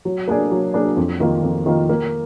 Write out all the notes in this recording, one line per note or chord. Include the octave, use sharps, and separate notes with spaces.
F#3
A#3 D4 G#4 D5
F#3
A#3 D4 G#4 D5
F2
D#3 A#3 F4
F2
D#3 A#3 F4
A#3